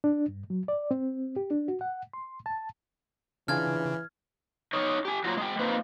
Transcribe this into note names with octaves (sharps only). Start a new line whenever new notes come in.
D4
G2
F#3
D5
C4
G4
D4
F#4
F#5
C6
A5
C#3 E3 D4 F4 G#4 F6 G#6
D#4 C#5 D#5
G4 G#5
F#3 F4 A5 A#5
G#3 G5
A#3 C4 D#4 F4 B4